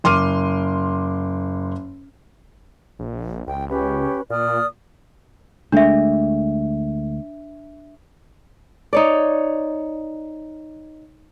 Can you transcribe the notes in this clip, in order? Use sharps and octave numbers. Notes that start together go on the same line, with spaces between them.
F#1 C6 D6 F6 D#7
A#1
C#2 G5
C#4 G4 B4
A#2 D5 D#6 F6
D2 G#3 A3 D4 E5
D#4 C#5 D5